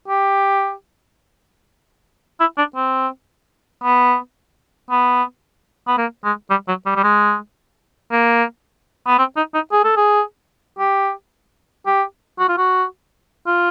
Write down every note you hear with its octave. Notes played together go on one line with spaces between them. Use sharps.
G4
E4
D4
C4
B3
B3
B3
A#3
G#3
G3
F#3
G3
G3
G#3
A#3
B3
C4
D#4
D#4
G#4
A4
G#4
G4
G4
F#4
F4
F#4
F4